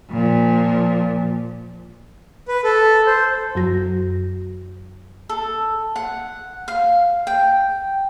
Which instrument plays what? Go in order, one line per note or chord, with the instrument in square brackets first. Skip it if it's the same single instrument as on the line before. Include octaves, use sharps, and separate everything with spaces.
[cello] A#2 F3
[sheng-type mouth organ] B4
A4
C5
[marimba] F#2 F#3 F#4 A#6
[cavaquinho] A4
F#5
F5
G5